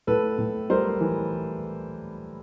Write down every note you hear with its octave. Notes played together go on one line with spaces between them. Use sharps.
A2 A4 B4
A2
G3 A#4 C5
E3